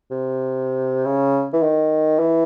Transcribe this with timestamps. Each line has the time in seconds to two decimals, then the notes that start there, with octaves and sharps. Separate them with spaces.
0.11 C3
1.05 C#3
1.53 E3
1.62 D#3
2.19 E3